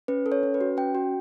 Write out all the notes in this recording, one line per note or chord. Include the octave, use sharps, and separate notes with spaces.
C#4 B4
A4
C#5
C#4
B4
F#4
C#4 G5
F#4